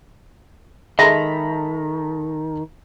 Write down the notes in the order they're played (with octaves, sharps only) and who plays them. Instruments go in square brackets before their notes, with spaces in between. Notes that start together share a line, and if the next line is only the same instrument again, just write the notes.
[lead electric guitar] D#3 [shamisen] G#3 [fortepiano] A4 A#5 B5 [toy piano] E5